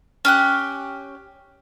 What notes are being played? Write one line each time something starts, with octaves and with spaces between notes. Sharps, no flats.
C#4 G4 F#6